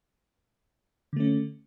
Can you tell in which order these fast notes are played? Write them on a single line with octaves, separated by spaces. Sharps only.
D3 A3 C#4